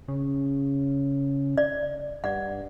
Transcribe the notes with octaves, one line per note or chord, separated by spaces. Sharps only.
C#3
D5
G2 D5 F#5